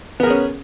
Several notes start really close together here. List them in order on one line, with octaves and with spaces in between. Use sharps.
B3 A#4 G#4 C#4